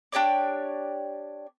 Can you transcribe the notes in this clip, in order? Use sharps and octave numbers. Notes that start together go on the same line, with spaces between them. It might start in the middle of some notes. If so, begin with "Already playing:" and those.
D4 G4 C#5 D5